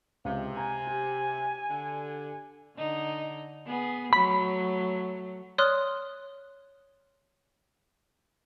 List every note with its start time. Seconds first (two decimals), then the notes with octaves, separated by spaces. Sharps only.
0.25 C#2 C3
0.57 G#5 A#5
0.87 G4
1.70 D3
2.77 D3 D#4
3.66 B3 G#4
4.13 F#3 A3 B5
5.58 C#5 D5 C6 D#6 F6 F#6